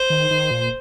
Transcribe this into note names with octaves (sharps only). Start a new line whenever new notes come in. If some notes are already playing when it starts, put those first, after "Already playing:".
Already playing: C5
D#3
D#3
A#2